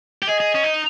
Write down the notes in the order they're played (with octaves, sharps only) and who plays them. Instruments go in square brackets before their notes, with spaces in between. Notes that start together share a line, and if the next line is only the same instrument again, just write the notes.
[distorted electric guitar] G4
[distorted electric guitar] G#4 [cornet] D#5
[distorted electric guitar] G#4
C#4
D#4